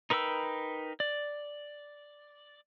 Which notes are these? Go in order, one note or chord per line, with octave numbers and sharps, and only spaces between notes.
D#4 A#4 B4 G5 E6
D5